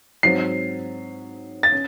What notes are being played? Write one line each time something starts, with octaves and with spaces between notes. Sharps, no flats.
G#2 F#3 C4 C7
A6
C#4